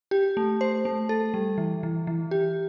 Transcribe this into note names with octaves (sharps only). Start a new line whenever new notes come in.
G4
A3
C5
A3
A4
G3
E3
E3
E3
G4